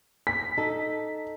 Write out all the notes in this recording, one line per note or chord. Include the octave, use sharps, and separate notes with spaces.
B6
D#4 A4